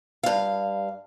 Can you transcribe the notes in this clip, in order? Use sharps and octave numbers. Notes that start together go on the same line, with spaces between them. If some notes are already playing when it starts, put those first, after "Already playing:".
G2 F5